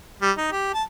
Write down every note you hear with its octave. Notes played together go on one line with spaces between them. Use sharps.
G3
D#4
G4
A5